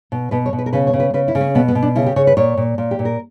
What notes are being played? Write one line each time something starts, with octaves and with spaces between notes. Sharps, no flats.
B2
B2 B4
C#5
B2
B4
A#4
C#3 B4
C#5
C#3
B4
C#3 B4
E4
C#3
C#4
B2 B3
B3
B2
D4
C#3 E4
G4
C#3 C#5
B4
A#2 C#5
A#2
A#2
G4
A#2
A#4